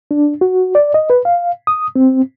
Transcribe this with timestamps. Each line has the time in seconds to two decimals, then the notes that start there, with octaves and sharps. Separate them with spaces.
0.11 D4
0.41 F#4
0.75 D5
0.94 D#5
1.10 B4
1.25 F5
1.67 D#6
1.96 C4